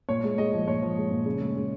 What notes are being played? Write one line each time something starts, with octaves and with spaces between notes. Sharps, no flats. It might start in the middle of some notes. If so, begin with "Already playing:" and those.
A#2 C#5
G#3
G#3 D#5
F3
A#2 C#5
F3
G#3
A#2
C#3
G#3
G#3